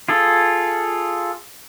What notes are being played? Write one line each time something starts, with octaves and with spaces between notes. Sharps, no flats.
F4 G#4 A4